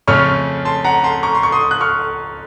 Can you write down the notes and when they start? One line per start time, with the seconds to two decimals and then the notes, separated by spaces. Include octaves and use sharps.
0.08 F2 C#3 A3 C#4 C#6 F6
0.65 A5 C6
0.84 F#5 A#5
1.04 A5 C6
1.23 A#5 C#6
1.35 C6
1.43 C#6
1.52 C6 D#6
1.71 F#6
1.81 C#6 F6